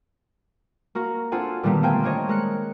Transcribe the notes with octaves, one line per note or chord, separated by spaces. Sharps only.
A#3 F#4 A#4
C4 D4 F4 A4 F#5 G#5
A#2 D3 D#3 G3 A#3 B3
A3 A#3 C4 A4 G5 G#5
A#3 D4 C5 C#5 D#5
G#3 A#4 F#6 C#7